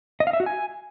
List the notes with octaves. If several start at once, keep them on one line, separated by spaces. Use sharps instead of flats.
D#5
F5
E5
F#4
G#5